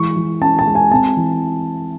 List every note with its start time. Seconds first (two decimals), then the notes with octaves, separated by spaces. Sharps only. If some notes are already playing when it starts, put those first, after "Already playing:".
Already playing: E3 G#3 C#6
0.16 E3
0.41 C#4 A5
0.59 A5
0.67 G#3
0.75 G#5
0.91 C4 A5
1.17 E3